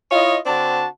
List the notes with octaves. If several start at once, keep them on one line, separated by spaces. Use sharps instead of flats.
E4 F4 C#5 D#5
D3 C4 D4 F#4 A5